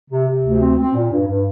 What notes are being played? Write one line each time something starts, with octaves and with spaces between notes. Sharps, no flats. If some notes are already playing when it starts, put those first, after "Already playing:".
C3
C3
D2
C4
C4
A#2
G2
G2